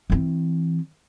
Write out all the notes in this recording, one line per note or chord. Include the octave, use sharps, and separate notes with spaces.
E3 C4